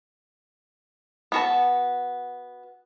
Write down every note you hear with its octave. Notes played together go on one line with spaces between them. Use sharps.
B3 F#4 A5